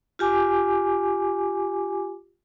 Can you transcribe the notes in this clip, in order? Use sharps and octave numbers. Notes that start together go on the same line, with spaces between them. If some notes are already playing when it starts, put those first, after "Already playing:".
F4 G4 G#5 D6